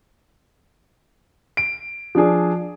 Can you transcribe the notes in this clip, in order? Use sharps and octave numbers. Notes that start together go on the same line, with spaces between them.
D7
F3 D4 G#4